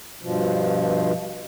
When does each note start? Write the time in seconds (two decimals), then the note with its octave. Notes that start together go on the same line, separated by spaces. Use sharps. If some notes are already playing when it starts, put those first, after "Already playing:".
0.21 G2 B2 F3